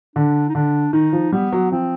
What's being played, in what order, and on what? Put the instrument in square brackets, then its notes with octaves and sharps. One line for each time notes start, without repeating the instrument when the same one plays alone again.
[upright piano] D3 [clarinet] D4
[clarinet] D#4
[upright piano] D3 [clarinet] D4
[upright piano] D#3 [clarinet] D#4
[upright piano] F3
[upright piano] G3 [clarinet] B3
[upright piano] F#3
[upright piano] F3 [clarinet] C4